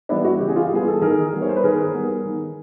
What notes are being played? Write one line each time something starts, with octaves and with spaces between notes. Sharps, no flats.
E3 G3 B3 D4 E4
E4 F#4
C#3 G4
G#4
F4 G4
E3 G3 B3 G#4
A4
D#3 G#4 A#4
G3 B3
C#5
C5
B4
D#3 G#4 A#4
G3 B3
D#3